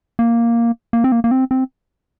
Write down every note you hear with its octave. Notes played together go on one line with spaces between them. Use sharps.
A#3
A#3
C4
A#3
A#3
C4
C4